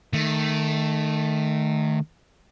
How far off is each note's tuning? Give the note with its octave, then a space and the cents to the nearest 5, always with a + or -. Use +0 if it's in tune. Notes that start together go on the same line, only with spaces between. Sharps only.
D#3 -20 A3 +0